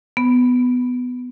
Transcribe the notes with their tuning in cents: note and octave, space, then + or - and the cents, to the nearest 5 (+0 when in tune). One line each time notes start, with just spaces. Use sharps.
B3 +10